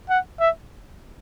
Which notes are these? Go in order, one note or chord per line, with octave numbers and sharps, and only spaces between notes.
F#5
E5